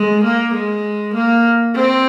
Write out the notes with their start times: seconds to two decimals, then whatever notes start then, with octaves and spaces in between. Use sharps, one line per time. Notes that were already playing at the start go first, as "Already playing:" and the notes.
Already playing: G#3
0.24 A#3
0.54 G#3
1.14 A#3
1.76 C4